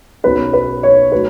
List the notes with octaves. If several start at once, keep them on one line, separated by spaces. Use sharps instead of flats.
B1 B2 F#3 C#4 B4
B4
C#5
F#3 A3 B4